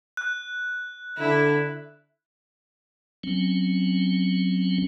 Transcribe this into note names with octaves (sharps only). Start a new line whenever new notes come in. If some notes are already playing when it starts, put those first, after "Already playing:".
F#6
D3 E4
F#3 C4 C#4